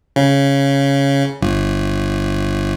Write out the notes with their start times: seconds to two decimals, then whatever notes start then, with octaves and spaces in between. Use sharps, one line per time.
0.16 C#3
1.41 G1